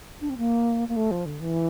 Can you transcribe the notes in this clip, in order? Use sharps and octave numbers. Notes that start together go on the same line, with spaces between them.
D4
C4
A#3
A#3
A3
F3
D3
E3